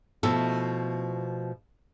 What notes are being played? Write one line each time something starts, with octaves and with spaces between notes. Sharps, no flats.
B2 F3 A3 E4 A4